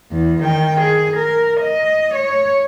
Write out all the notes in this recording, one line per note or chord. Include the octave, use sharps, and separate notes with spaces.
E2
D#3 G5
G#4
A#4
D#5
C#5